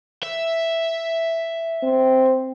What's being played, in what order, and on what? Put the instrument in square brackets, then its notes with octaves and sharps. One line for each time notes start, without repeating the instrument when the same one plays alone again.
[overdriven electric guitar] E5
[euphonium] C4